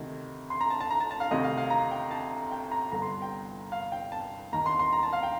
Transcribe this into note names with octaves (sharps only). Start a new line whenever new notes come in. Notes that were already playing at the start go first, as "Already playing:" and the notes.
Already playing: D2 C3 D#3
C6
A#5
A5
A5
A#5
A5
A5
F5
D2 C3 D#3 D#5
F5
F5
A#5
G5
A5
G5
A#5
G1 G2 D3 A#5
C6
G5
F5
G5
A5
D#2 D#3 A#5
C6
C6
A#5
A5
F5
G5